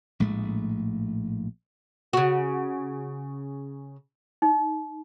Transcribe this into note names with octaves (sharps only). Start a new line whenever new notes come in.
A#1 A2 G#3 A3
C#3 F#4
D#4